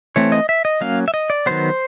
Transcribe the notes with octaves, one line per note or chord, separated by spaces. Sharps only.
E3 A3 C4 C#5
D#5
E5
D#5
F#3 A#3 C#4 F5
E5
D#5
D5
D#3 F#3 B3 C5